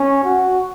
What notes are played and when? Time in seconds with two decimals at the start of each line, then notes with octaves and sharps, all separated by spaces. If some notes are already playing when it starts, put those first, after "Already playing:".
Already playing: C#4
0.24 F#4